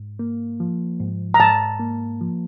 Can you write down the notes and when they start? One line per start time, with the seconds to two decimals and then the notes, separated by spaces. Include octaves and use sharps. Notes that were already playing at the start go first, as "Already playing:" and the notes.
Already playing: G#2
0.19 A#3
0.60 F3
1.00 G#2
1.34 A#5
1.40 G#2 A5
1.80 A#3
2.21 F3